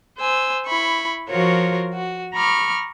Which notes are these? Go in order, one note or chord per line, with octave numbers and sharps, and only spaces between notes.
C5 G#5 E6
E4 B5 C#6
F3 F4 F#4 A#4 C5 C#5
F#4
A#5 B5 C#6 D6 F6